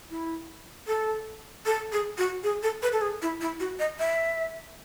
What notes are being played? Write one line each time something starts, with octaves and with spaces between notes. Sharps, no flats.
E4
A4
A4
G#4
F#4
G#4
A4
B4
A4
G#4
E4
E4
F#4
D#5
E5